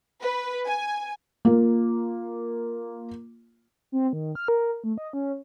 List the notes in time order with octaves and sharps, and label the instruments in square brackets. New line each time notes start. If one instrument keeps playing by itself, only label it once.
[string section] B4
G#5
[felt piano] A#3 F4
[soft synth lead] C4
D#3
F6
A#4
A3
D#5
C#4